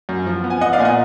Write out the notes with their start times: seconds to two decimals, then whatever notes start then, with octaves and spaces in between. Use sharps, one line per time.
0.09 F#2
0.27 F3
0.44 B3
0.50 G#5
0.61 B3 D#5 F#5
0.73 D5 F5
0.79 A#2 G#5
0.85 D#5 F#5